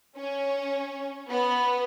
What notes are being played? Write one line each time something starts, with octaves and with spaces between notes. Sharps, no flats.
C#4
B3